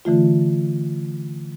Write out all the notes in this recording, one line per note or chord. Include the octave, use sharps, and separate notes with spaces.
D3 E3 A3 F4